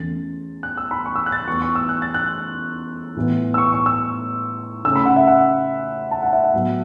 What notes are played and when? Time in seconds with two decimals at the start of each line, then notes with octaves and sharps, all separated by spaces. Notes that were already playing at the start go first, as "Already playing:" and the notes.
Already playing: E2 E3 A3 C#4 A6
0.63 F#6
0.77 E6
0.91 B5
1.05 C#6
1.16 E6
1.26 F#6
1.32 A6
1.37 F#6
1.47 E2 E3 B3 C#6
1.62 C#6
1.75 E6
1.89 F#6
2.02 A6
2.14 F#6
3.16 A2 E3 B3
3.54 E6
3.58 C#6
3.72 C#6
3.86 E6
4.85 C#3 A3 C#4 E6
4.96 B5
5.06 F#5
5.16 E5
5.27 F#5
6.11 A5
6.22 F#5
6.33 E5
6.44 F#5
6.54 A2 F#3 B3